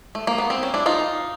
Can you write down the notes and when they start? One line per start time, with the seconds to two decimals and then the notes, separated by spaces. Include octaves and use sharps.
0.15 A3
0.27 A#3
0.38 B3
0.50 C4
0.63 C#4
0.74 D4 E4
0.86 D#4 F4